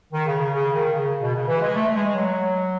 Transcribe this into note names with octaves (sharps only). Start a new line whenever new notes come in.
D#3
C#3
C#3
C#3
D#3
C#3
B2
C#3
E3
G#3
A3
G#3
G#3
F#3